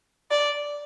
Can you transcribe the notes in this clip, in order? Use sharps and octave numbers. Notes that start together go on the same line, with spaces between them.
D5